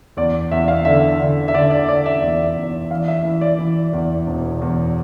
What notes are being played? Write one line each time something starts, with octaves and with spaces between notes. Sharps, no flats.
E2 D5
E2 E5
F5
D3 E5
D3
E5
D3 D5
D5
D3 D5
E5
E2
E2
E3 F5
E5
E3
D5
E3
E2
E1
E2